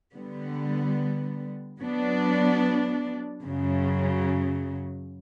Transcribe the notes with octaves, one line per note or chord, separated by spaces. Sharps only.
D3 G3 B3
F#3 B3 D4
F#2 C#3 F#3